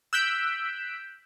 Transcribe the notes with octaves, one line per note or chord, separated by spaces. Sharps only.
E6 F#6 G6 B6 D7